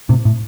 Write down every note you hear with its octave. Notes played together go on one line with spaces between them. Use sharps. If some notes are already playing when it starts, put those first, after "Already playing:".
A2 C3
A2